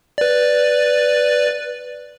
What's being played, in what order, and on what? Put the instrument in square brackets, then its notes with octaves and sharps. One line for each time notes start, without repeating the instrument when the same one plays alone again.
[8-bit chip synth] B4 D5